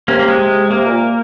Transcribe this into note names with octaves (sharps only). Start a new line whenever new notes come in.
C3 A#3 C#4
A#3
G#3
G#3
C3 A#3
A#2